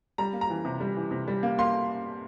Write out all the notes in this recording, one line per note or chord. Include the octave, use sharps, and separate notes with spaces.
G3 A#5
A#3
A#5
E3
C3
G3
E3
C3
G3
A#3
A#3 C6